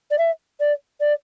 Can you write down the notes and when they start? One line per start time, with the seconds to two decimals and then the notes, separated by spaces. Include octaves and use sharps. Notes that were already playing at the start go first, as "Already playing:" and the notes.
0.10 D5
0.18 E5
0.60 D5
1.00 D5